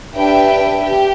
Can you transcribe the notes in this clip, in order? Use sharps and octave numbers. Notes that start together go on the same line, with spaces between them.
D4 G4 B4 E5 G5
G4